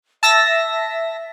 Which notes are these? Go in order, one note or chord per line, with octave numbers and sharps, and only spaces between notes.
E5 A5 E6 A#6